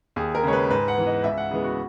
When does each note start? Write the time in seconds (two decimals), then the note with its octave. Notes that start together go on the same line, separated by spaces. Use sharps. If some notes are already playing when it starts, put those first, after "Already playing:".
0.16 D#2 G#4
0.35 A#4
0.43 C#3 G#3 C#5
0.53 B4
0.70 G#2 B4
0.88 F#5
0.97 E3 B3
1.06 D#5
1.24 C#2 E5
1.38 F#5
1.51 C#3 E3 G#3 B3 G#4
1.64 F#4